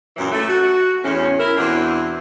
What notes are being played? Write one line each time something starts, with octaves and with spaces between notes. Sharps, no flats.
F#2 A#2 E3 F#3
A3
F#4
E2 A2 C#4
E4 A#4
E2 B2 C4 D4 E4 F#4